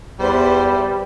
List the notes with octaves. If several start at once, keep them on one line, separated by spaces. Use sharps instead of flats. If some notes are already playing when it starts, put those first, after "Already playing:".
E2 G3 E4 B4 C5